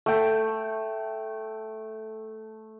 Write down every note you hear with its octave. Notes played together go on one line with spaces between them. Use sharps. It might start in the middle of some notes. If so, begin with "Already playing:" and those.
A3 G5